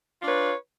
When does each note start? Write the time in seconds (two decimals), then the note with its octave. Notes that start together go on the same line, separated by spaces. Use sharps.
0.19 F4
0.21 D4
0.24 C#5
0.26 B4